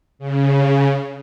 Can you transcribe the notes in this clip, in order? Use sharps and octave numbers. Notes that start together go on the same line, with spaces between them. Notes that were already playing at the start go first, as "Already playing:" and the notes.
C#3